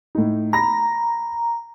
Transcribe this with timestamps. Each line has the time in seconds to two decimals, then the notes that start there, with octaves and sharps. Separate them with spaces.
0.15 A2 D#4
0.53 A#5 B5 A#6